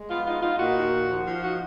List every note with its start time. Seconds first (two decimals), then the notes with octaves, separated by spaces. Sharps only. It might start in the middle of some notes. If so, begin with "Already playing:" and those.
Already playing: G#3
0.09 B3 F4
0.26 D#4 F4
0.42 D#4 F4
0.59 A#2 F#4
0.76 D#2
0.92 D#2
1.09 F3
1.26 F3
1.43 D#4 F#4